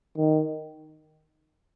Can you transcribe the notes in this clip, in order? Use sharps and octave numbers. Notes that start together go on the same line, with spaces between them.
D#3